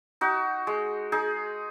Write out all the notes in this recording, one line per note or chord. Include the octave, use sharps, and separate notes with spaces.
D#4 F#4
G#3
D#4 G#4